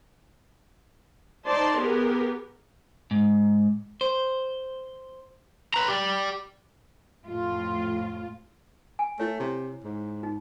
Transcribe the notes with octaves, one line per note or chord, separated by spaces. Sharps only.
D#4 C5 D5 A5 C6
B3 G4 G#4 A#4
G#2
C5
B4 A#5
G4 D5
F2 A2 F4
G#5
A3 E4 C#5
C3
G#2
D#4